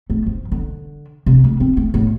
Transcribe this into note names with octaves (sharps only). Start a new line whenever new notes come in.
A3
F3
D3
C3
A3
C4
A3
A2